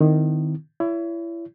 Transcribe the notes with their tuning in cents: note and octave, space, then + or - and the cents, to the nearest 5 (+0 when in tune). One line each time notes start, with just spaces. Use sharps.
D#3 -15 C4 -35 E4 -20
E4 +25 C#5 +35